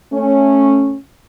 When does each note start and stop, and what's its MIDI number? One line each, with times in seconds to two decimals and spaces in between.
0.13 0.96 57
0.13 0.96 61